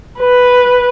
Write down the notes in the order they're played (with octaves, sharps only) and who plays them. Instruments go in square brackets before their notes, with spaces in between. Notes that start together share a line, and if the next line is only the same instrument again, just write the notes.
[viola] B4